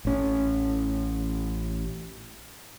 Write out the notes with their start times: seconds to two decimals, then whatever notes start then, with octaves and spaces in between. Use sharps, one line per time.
0.05 A1 C#4